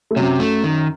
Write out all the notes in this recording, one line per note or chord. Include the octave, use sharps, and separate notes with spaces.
A3
F#2 C3 F#3
A3
D#3